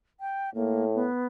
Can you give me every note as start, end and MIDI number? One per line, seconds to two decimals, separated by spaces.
0.20 0.50 79
0.55 1.06 45
0.55 0.85 58
0.94 1.27 59